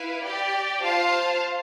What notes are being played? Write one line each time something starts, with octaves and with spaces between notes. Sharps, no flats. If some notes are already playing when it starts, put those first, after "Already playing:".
Already playing: E4 B4 F5
G4 D5 G5
F4 C5 F5 A5